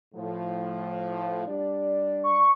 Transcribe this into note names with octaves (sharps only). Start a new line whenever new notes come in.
A2 F3
G3 D4 D5
C#6